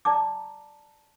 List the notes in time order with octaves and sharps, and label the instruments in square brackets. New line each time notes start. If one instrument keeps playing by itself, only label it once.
[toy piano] D5 A5 A#5 D6